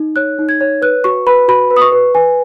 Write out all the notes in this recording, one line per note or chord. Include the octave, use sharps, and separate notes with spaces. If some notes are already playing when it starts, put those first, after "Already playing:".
Already playing: D#4
C#5 F#6
D#4
G#6
C#5
B4 F#6
F#4 C#6
B4 B5
F#4 B5
B4
D#6
C#6
B4
B4 G#5